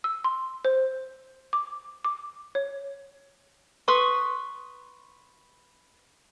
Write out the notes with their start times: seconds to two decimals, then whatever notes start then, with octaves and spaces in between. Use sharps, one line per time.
0.04 E6
0.24 C6
0.65 C5
1.53 D6
2.05 D6
2.55 C#5
3.88 B4 C6 C#6 D#6